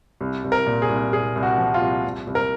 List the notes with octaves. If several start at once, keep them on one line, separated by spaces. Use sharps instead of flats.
C2
C2
A#4
A#2
G#4
C2
A#2 G#4
C2
F#4
F3
F4
C2
C2
C2
A#4